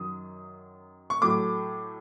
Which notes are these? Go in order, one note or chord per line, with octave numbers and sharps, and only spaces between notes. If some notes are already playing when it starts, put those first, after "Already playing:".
Already playing: F#2 D#3 F#3 D#6
C#6
A2 F#3 A3 D6